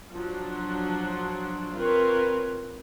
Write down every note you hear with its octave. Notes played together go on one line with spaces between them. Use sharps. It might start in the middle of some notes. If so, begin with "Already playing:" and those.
F3 F#3 D4
C4 F4 A#4 B4 C#5